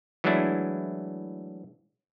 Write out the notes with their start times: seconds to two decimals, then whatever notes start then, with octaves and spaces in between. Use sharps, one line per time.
0.24 E3 F#3 G#3 A3 D4 E4